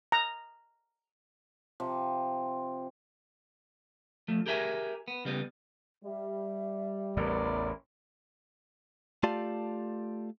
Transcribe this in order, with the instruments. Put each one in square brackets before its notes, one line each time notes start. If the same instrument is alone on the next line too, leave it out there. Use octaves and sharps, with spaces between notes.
[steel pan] A#5
[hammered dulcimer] C3 F3
[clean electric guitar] F3 A3
G4 G#4 A#4 E5 G5 G#5
B3
C#3 G3 B3
[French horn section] G3 [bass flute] E5
[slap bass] A1 E2 A2 [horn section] B3 A#4 D5
[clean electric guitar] A3 F4 G4 D5 F5 A5